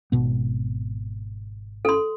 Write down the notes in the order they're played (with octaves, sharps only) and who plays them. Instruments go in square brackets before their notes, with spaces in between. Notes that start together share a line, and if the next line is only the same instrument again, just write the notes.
[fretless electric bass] G#1 B2 B3
[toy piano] A4 C6